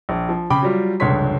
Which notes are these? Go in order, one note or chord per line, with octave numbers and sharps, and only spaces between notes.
A#1
F3
C#3 G5 B5 D6
F#3 G3 F4
F1 C#2 G2 C#5 C6 B6